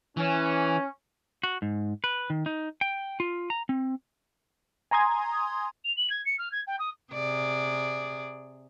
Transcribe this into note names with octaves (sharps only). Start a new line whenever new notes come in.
E3 C#4
F#4
G#2
B4
D#3
D#4
G5
F4
A#5
C4
G#5 A#5 C6 D#6 G#6
F7
F#7
G#6
C#7
F6
G#6
G5
D#6
C3 G#4 D5